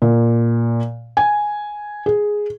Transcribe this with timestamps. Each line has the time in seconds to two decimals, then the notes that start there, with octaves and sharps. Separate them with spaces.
0.02 A#2
1.17 G#5
2.06 G#4